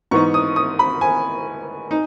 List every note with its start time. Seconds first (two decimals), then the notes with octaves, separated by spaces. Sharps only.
0.11 G#2 E3 B3 D#4 C#6
0.34 D#6
0.56 D#6
0.79 B5
1.01 G#5
1.91 D#4